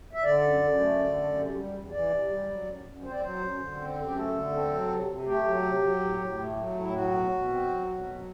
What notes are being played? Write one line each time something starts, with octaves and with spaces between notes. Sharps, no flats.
E5
D3 D5
F#2
F#2
A3
D3
F#2
C3
G3
E2
E3 D5
C3
G3
F#3
F#2
F#2
C4 C5
D5
F#3 C5
F#2
D3
C4
F#2
G4
A3 A4
D3
C4
F#3
C3
C3
A3 G4
F#3
C3
F#3
A2
A2
A3
F#3
A2
E4
F#3 F#4
B2
B2
C4
F#3
B2
F#3